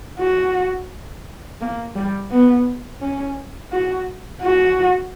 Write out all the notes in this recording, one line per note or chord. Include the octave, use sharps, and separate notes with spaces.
F#4
A#3
G3
B3
C#4
F#4
F#4